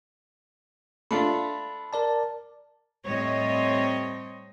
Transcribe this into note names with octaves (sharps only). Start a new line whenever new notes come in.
A3 D4 F4 B5
A#4 D5 A5
A2 G3 C4 C#5 D#5